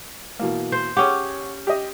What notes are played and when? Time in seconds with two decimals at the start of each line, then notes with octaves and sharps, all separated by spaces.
0.40 B2 E3 A#3
0.72 C5
0.97 C#4 G4 G#4 C#5 F#5
1.67 G4 D#5